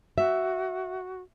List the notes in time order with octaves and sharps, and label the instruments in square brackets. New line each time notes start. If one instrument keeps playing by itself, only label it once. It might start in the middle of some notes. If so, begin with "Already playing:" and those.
[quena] F#4 [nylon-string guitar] E5